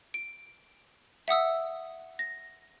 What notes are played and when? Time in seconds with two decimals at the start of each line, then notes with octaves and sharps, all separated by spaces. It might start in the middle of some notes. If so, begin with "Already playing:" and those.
0.14 D7
1.28 E5 F#5 D#6 E6
2.19 A#6